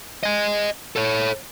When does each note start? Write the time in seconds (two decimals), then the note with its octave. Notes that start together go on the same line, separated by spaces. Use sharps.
0.23 D#5 G#5
0.96 A4 C#5